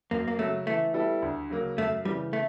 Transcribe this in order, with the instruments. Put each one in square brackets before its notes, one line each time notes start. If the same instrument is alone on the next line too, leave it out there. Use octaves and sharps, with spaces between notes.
[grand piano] F#2 [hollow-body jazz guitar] A#3
[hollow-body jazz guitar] A#3
[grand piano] C#3 F#3 [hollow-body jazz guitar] A3
[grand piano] E3 [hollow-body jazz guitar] A3
[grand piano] G3 B3 E4 A4
D2
C#3 F#3 A#3
[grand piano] F#2 [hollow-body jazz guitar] A3
[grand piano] C#3 E3 [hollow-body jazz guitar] G3
[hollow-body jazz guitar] A3